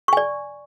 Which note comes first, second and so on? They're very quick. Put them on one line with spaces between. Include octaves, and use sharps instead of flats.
C#6 G#5 D5